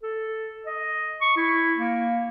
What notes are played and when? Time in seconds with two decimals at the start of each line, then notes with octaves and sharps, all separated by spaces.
0.03 A4
0.66 D#5
1.21 C#6
1.37 E4
1.78 A#3